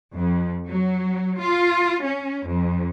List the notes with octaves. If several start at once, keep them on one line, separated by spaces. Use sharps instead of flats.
F2
F#3
F4
C#4
F2